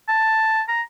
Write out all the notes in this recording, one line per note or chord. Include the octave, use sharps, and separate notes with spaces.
A5
A#5